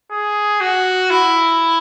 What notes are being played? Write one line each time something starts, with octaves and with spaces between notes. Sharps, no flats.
G#4
F#4
E4